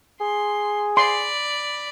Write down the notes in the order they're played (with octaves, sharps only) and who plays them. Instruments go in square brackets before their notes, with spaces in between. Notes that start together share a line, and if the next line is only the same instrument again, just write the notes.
[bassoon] G#4 [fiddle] C6
[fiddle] D5 B5 [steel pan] C6